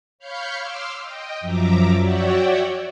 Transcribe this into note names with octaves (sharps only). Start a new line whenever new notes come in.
C#5 F5 B5 F6 G6 C#7
C6 D6 E6 F6
D#5 G5
F#2 F3 E5 A#5 D6
F#4 C#5 D5 E5 F#5 G5